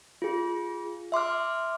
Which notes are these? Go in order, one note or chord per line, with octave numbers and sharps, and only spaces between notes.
F4 G#4
E5 C6 D6 F6